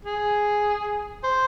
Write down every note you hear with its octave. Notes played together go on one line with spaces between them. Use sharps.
G#4
C5